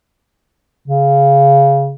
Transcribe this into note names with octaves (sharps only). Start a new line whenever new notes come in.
C#3